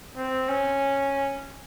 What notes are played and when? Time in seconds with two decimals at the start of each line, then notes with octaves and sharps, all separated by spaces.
0.17 C4
0.49 C#4